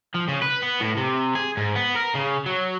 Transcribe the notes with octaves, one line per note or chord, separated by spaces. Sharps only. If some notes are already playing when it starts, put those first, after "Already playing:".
F3
C#3
B4
B3
A2
C3
G#4
G#2
B3
A#4
C#3
F#3